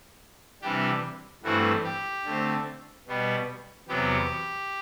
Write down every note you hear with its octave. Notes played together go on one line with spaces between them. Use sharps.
C3 E3 G3 D4 G4
G2 E3 A3 C4 F#4
G4
D3 A3 C4
B2 G3 B3
E2 C3 F#3 B3 G4